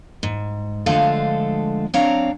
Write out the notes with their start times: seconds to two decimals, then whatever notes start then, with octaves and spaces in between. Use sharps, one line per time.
0.23 G#2
0.86 D3 F3 G#3 A3 A4 F5
1.94 F#3 C4 D4 C#5 F5 A#5